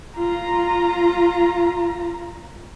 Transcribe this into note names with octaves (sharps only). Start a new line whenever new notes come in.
F4 A#5